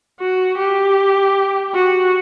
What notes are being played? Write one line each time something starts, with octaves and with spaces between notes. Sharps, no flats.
F#4
G4
F#4